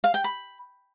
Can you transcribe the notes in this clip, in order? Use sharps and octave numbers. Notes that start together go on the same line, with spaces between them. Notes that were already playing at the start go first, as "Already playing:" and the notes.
F5
G5
B5